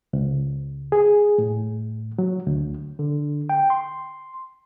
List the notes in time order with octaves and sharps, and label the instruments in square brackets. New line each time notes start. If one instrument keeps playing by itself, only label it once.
[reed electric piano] C#2
G#4
A2
F#3
D2
[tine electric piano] D3
G5
C6